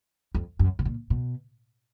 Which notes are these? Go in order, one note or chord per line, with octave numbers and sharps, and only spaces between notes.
F2
F#2
B2
A#2
B2